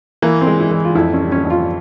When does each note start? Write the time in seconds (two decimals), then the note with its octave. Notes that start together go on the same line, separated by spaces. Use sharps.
0.22 E3 A#3
0.41 C4
0.47 G#3
0.60 E4
0.71 E3
0.85 F4
0.95 F2 E4
1.14 C#4
1.20 G3
1.32 C#4
1.45 F2
1.50 F4